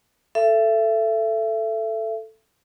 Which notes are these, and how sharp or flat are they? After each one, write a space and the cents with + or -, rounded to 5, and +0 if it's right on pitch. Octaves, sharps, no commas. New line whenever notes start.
A4 +0 E5 +30